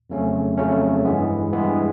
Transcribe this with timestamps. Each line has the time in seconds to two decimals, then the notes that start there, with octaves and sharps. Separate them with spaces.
0.10 F2 C#3 F#3 A3 C#4
0.58 F2 C#3 F#3 A3 C#4
1.05 G2 E3 G#3 B3
1.52 G2 E3 G#3 B3